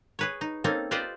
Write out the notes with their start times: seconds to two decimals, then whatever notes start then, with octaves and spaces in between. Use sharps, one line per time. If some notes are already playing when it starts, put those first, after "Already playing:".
0.19 G#4 B4 C#5
0.41 D#4
0.64 A#3 C4 C#4 D#4 A4
0.91 F4 G4 B4 C5 D5 D#5